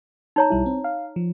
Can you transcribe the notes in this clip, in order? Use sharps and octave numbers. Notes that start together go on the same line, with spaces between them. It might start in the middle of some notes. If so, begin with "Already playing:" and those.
D#4 C#5 A#5
B1 G3 E4
C4
F5
F3